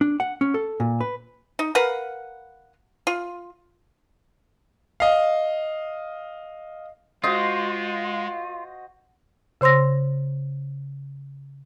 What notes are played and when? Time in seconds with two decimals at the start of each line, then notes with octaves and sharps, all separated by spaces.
0.01 D4
0.20 F#5
0.41 C#4
0.54 A4
0.80 A#2
1.01 B4
1.59 D#4
1.75 A#4 B4 F5 F#5
3.07 F4
5.00 D#5 F5
7.24 G#3 F4 F#4 C5 D#5
9.61 C#3 C5 C6 E6 A#6